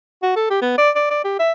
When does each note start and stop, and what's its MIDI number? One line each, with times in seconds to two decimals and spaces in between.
0.23 0.35 66
0.36 0.50 69
0.50 0.60 67
0.62 0.77 59
0.78 0.90 74
0.96 1.10 74
1.11 1.21 74
1.24 1.38 67
1.39 1.52 76